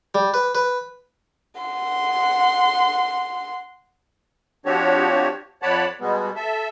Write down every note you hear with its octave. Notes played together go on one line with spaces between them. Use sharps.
G3
B4
B4
F#5 C6
F3 C4 D4 F#4 G4 C#5
F2 C#5 D5 F#5 A5 B5
B2 G3 G#3 B3
A4 E5